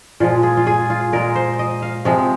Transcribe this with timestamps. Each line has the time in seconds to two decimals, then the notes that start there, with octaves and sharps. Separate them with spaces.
0.20 A#2 F3 G#3 F4
0.43 G#4
0.57 F4
0.67 G#4
0.90 F4
1.13 A#2 G#3 A#4
1.35 C5
1.59 D#5
1.82 F5
2.05 C3 F3 G#3